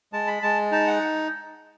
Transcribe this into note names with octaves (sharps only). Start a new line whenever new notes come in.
G#3 A5
B5
G#3 A5
D#4 A5
F#5